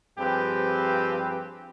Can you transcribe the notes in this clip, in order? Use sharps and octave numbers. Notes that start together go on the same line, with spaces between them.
G2 F3 C4 G4 G#4 B4